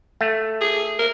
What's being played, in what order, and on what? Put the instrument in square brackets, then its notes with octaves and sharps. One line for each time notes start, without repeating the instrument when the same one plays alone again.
[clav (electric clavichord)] A3
[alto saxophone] G#4
A#4